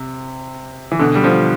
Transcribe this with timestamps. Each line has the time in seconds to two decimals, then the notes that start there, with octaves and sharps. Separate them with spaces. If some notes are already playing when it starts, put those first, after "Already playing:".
Already playing: C3
0.92 E3
0.99 B2 D3
1.15 G3
1.24 D3 F3